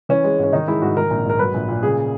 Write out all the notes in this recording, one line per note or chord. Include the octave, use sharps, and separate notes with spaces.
E3 C#4
G#3
G#2 C#4
D#3 D#4
G#3 E4
G#2 F#4
D#3 A#4
A#1
G#2 A#4
F#3 B4
A#1
A#2
C#3 G#4